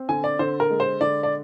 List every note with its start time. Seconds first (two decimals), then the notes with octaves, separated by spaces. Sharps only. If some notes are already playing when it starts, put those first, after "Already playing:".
Already playing: C4
0.09 D3 G#5
0.24 D5
0.39 D3 C5
0.60 A#4
0.70 G#3
0.80 C5
1.01 D3 D5
1.23 D5